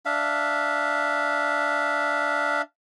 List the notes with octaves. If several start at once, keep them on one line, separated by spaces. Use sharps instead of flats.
D4 E5 F5